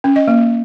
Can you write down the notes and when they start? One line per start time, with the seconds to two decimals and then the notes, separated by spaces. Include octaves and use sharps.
0.04 C#4
0.16 D#5
0.28 A#3